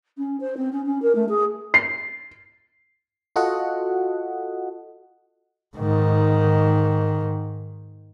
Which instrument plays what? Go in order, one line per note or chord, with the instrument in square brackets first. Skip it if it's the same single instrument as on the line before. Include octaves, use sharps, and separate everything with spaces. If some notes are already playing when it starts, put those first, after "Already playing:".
[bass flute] C#4
C5
C4
C#4
C#4
A#4
A3
G#4
[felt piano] C7
[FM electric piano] F4 F#4 A4 D#5 F#5
[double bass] G#2 D#3